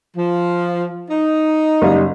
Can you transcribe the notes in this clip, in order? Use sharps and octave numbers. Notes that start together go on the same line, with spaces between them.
F3
D#4
F#1 G3